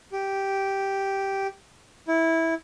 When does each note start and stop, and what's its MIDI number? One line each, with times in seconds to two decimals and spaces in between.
0.12 1.47 67
2.08 2.54 64